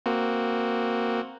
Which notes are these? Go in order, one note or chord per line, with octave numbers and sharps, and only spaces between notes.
A#3 C4 F#4